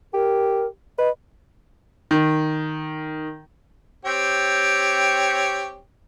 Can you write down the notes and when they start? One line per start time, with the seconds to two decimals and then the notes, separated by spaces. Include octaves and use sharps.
0.14 G4 A#4
0.99 B4 D#5
2.11 D#3
4.05 C4 G4 C#5